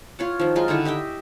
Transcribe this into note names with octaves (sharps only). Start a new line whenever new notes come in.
F4 C#5 F#5
D#3 F3
F#3 G#3 D#4 F4
D3 D#3 E4 C#6
G4 D#5 E5 G5